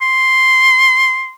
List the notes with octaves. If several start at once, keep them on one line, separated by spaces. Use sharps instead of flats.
C6